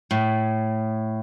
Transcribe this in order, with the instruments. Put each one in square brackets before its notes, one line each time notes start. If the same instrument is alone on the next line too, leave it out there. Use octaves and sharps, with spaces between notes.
[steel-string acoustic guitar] A2